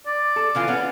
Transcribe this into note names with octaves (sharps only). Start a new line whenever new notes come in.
D5
A4
C#3 E3 F4
B3 C#4